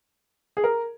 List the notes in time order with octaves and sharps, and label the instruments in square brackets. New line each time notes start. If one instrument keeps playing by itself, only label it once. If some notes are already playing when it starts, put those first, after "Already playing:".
[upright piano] G#4
A#4